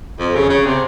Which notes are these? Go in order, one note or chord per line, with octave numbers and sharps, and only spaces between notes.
F2
C#3
C#3
C3